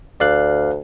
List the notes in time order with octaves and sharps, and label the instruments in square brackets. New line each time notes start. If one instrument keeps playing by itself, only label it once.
[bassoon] D2 [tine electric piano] D5 F5 F#6